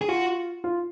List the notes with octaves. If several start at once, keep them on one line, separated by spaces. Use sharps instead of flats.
G#4
F4 F#4
F4